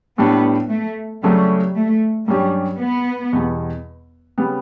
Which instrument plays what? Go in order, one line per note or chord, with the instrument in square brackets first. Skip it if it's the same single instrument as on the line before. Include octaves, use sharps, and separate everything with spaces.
[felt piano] A2 G3 D4 [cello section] B3
[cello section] A3
[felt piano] C#3 F#3 A3 C#4 [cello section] G3
[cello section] A3
[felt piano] G2 F#3 C#4 G4 [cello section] G3
[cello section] B3
[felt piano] E2 B2 G3
C#3 G3 B3